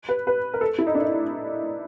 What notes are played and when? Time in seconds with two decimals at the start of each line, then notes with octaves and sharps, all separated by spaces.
0.09 B4
0.27 B4
0.54 A#4
0.61 A4
0.78 E4
0.87 D#4
0.95 D4
1.02 D#4